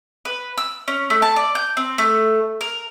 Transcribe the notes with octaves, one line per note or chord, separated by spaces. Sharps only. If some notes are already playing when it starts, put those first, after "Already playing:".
B4
E6
C#4
A3
A5
D5
G6
C4
A3
A#4